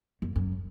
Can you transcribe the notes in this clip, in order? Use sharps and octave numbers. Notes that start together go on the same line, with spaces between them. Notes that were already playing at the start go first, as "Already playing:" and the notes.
F#2
F#2